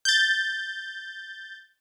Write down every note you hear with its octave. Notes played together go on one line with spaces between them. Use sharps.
G6 A6